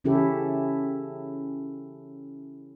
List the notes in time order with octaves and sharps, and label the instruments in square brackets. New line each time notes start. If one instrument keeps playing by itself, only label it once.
[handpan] C#3 E3 C#4 E4 G4 A4